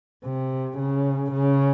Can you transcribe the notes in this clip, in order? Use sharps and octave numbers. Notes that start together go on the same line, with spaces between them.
C3
C#3
C#3